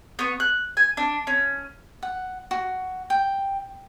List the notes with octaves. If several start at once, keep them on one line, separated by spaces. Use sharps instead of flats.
B3 C#6
F#6
G#5
D4
C#4
F#5
F#4
G5